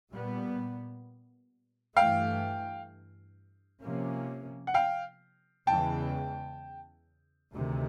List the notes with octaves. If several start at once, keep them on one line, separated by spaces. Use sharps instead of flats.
A#2 G3 B3
G2 E3 A3 F5 G5
C3 F3 A#3 C#4
F#5
F5 G5
E2 C#3 E3 G#3 G5 A5
D2 C3 D#3